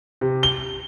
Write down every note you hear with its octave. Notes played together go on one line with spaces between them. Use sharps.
C3
G7